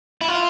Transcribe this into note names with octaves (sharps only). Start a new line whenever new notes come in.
E4
F4